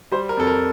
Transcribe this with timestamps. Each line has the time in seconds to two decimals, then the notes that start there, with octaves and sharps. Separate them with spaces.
0.12 G3 C5
0.29 A#4
0.37 F2 A4
0.47 A#4